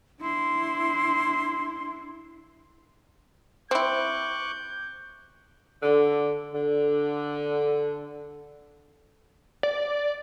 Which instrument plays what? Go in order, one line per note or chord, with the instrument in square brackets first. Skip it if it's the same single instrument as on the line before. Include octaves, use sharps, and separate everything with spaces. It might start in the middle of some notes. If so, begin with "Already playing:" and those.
[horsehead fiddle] D4 E4 [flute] C6
[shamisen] C4 E4 [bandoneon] C#6 D6 F#6 [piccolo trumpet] G6
[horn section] D3
D3
[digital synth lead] D5